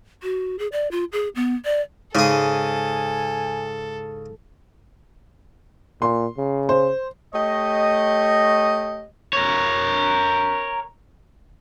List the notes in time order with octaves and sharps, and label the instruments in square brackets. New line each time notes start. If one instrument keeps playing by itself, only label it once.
[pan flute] F#4
G#4
D5
F4
G#4
B3
D5
[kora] G#2 [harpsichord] C#3 G#4 [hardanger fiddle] A4 [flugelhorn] G#5
[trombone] A#2 [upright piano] C6
[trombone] C#3
[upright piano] C5
[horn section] A3 G4 C#5 D#5
[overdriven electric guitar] A#4 C#5